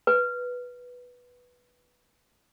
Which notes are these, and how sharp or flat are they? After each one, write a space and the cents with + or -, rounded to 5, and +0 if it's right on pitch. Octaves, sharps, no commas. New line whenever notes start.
B4 -5